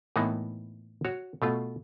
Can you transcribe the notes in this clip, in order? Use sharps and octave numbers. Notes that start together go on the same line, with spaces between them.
A2 E3 A#3 B3 D#4
F#4 C#5
B2 A3 F4